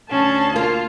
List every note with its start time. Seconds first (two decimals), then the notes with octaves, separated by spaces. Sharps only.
0.10 D2 C#4 A5
0.56 A#3 F4